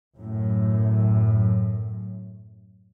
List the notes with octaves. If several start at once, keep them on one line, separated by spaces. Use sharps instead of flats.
F#2 A2